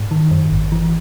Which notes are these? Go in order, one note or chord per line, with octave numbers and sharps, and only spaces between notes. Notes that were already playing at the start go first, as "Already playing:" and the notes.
Already playing: G#2
D#3
F#2
G#1
E3